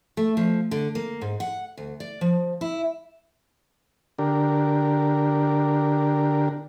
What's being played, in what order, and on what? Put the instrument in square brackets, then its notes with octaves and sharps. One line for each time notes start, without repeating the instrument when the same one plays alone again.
[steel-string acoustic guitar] A3
F3
D3
A#3
G#2
F#5
D2
D5
F3
E4
[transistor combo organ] D3 D4 G4 A#4